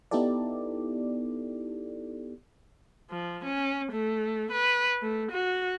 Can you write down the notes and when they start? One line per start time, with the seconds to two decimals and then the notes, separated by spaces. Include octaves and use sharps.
0.11 B3 D#4 E4 G4 A4 D5
3.11 F3
3.44 C#4
3.92 A3
4.52 B4
5.02 A3
5.31 F#4